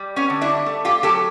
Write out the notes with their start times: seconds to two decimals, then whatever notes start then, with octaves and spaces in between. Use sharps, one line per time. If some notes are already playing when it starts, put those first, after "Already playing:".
Already playing: G3
0.16 B3 C#4
0.30 D3
0.41 D4 E4
0.66 A3
0.85 F4 G4
1.03 F#3 G4 A4